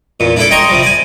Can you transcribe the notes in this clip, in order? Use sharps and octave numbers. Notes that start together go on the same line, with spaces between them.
E2 A#2
D4 E4 A4 D6
D#5 G5 A#5 C6 C#6
C3 F3 G3
D5 G#5